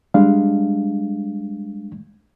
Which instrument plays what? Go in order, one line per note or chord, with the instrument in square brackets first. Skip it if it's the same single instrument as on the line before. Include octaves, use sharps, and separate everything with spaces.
[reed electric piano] G3 G#3 D4 F5